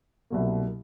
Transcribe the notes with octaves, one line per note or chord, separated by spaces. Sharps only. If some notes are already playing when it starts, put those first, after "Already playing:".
C2 B2 F#3 A#3